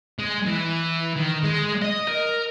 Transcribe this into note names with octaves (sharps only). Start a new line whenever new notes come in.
G#3
E3
D#3
G#3
D#5
A#4